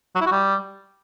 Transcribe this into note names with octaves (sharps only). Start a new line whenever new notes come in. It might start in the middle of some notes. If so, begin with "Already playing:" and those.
F#3
E4
F#4
G3